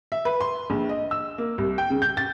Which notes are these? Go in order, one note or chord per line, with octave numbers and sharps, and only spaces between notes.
E5
B4
C6
A#1
D#5
E6
A#3
C2
G5
C#3
G6
A6